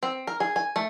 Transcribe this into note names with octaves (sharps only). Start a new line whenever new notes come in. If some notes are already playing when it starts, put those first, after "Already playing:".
C4
A#4
G#4
G#5
A3